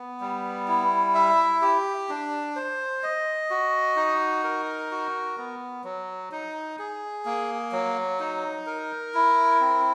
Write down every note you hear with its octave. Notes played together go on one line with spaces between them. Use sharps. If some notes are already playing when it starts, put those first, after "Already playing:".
Already playing: B3
G3
E4
E5
G4
D4
C5
D#5
F#4
D#4
A#4
F#4
B3
F#3
D#4
G#4
A#3
F#3
D#4
A#4
E4
C4